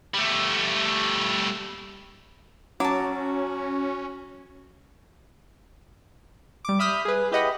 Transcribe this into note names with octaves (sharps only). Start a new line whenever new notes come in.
G3 A3
F#3 C#4 F#4 A5 D6
G3 D6
E5 B5 D#6 F6 G6 B6
G#4 B4
E4 G4 B4 D#5 F#5 B5